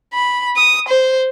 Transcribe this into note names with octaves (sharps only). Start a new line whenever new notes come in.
B5
D#6
C5